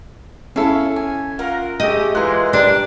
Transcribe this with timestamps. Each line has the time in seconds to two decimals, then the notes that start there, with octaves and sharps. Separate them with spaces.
0.56 C#4 E4 A4 F5
0.96 G#5
1.39 F4 A#4 F#5
1.80 G#3 A3 G4 D#5
2.15 A2 E3 G#3 F4 A#4 F#6
2.53 D4 G4 A#4